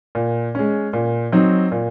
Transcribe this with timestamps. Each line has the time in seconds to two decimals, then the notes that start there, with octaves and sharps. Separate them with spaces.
0.15 A#2
0.55 G#3 C#4
0.93 A#2
1.32 F#3 C4 D#4
1.72 A#2